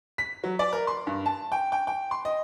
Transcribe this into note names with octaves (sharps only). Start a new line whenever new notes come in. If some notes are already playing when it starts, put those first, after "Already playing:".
B6
F#3
D5
A#4
C6
G2
A5
G5
G5
G5
C6
D#5